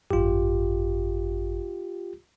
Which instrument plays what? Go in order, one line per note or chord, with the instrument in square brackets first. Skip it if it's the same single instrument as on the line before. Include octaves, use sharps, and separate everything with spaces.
[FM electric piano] G#1 F#2 [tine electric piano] F4 G4